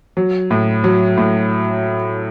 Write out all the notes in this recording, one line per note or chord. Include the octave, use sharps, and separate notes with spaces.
F#3
A2
F#3
A2